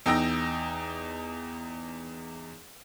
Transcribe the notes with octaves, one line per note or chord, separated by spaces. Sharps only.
E2 D#4 G5 E6 A#6